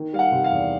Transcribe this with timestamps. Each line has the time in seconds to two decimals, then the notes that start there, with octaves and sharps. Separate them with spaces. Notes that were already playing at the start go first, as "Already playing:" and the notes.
Already playing: D#3
0.13 G3 F5
0.19 F#5
0.32 C3
0.44 F5
0.51 E2